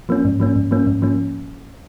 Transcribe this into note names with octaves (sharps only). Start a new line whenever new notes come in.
F3 A#3 C#4
G#2
F3 A#3 C#4
G#2
F3 A#3 C#4
G#2
F3 A#3 C#4